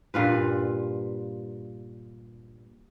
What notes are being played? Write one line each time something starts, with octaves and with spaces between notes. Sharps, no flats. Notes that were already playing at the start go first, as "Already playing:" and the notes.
G2 A#2 F4 B4